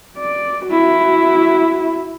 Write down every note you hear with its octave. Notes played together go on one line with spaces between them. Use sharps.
D5
E4 F#4